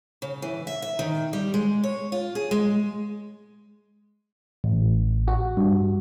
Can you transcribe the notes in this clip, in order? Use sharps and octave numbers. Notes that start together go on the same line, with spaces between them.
C#3
E3
E5
E5
D#3
G3
G#3
C#5
F4
G#4
G#3
A1
F#4
G2